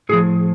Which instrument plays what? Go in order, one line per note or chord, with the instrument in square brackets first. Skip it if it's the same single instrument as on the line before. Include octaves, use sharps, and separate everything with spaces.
[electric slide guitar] A2 F3 G#4